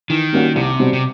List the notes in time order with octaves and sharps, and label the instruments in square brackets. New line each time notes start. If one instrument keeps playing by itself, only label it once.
[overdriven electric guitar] D#3 [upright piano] E3
[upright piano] G3 A#3 C#4 F#4
[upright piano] C2 [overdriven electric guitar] C3
[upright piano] B2 G3 C4
[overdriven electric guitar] C3